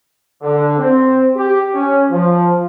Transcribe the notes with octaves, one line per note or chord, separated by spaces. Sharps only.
D3
C4
G4
C#4
F3